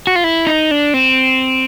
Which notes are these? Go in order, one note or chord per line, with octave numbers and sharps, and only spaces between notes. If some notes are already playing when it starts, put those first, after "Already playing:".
F#4
F4
E4
D#4
D4
C4